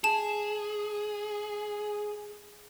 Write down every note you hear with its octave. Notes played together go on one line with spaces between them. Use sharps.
G#4 A5 E7